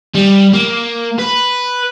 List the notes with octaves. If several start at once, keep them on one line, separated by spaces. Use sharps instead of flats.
G3
A#3
B4